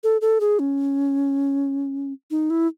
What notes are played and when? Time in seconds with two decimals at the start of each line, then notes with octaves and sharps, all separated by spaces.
0.04 A4
0.21 A4
0.41 G#4
0.59 C#4
2.31 D#4
2.50 E4